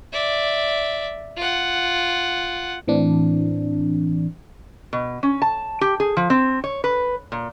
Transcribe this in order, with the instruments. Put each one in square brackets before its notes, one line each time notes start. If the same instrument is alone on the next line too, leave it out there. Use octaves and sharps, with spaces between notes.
[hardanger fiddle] D5 E5
F4 F#5
[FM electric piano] A2 E3 C4 D4
[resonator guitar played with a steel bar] B2
C#4
A5
G4
G#4
F3
C4
C#5
B4
A#2